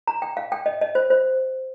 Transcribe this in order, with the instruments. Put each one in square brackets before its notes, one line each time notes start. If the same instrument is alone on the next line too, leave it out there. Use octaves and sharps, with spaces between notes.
[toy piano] A#5
G5
F5
G5
D#5
D#5
C5
C5